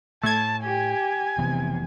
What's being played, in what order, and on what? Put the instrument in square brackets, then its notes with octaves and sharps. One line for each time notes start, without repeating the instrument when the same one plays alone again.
[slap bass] A2 [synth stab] A3 G#6 [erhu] A5
[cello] G4 [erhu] G#5
[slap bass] F1 E3 B3 [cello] C3